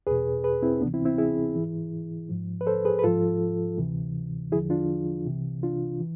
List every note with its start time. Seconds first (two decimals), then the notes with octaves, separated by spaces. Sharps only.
0.07 E2 B2 G#4 B4
0.44 G#4 B4
0.62 C4 E4
0.81 D2 C3 E3 B3 D4
0.94 C4 E4
1.05 C4 E4
1.18 E4 G#4
1.55 G#2 E3
2.29 G#2 F3
2.61 B4
2.67 A4 C5
2.85 G#4 B4
2.99 B4
3.03 G#2 F3 F4 A4
3.78 D2 C3 E3
4.52 E2 D3 F3 E4 G#4
4.70 D4 F4
5.26 C2 C3 E3
5.63 D4 F4
6.00 E3